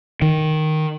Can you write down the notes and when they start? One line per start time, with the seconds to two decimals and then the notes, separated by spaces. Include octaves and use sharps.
0.22 D#3